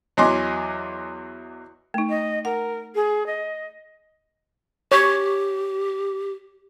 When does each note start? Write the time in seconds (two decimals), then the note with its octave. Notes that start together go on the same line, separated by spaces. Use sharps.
0.17 E2 F#3 D#5 G#5 C6 D6
1.94 A3 D#4
2.09 D#5
2.45 A#4 F#5
2.95 G#4
3.26 D#5
4.92 G4 C#5